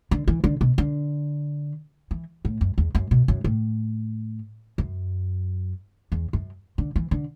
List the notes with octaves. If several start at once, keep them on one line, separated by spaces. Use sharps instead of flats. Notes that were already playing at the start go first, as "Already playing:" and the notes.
D3
E3
D3
B2
D3
E3
A2
F#2
E2
F#2
B2
F#2
A2
F#2
E2
F#2
D3
E3
D3